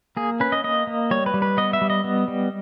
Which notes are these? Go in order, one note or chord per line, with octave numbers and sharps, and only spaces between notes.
A#3 G#4
C#4 B4
D#5
A#3 D#5
A#3
G3 C#5
B4
G3
B4
B3 D#5
E5
G3
D#5
B3
G3